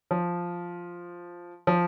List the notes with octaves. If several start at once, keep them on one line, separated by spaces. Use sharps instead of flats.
F3
F3